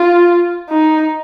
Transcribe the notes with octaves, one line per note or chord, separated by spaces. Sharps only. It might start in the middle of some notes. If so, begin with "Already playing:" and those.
Already playing: F4
D#4